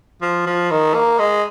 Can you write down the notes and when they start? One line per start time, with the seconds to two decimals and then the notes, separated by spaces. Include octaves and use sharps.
0.22 F3
0.46 F3
0.71 D#3
0.94 A#3
1.19 G#3